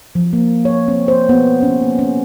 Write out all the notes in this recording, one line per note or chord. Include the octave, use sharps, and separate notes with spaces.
F3
A#3
C#5
C4
C5
B3
C#4
A#3
C#4